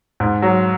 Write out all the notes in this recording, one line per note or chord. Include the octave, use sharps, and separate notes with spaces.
G#2
F#3